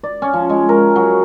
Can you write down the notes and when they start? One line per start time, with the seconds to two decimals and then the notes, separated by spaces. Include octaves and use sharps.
0.03 D5
0.22 C#4
0.33 F3
0.49 G#3
0.69 A#4
0.96 F#3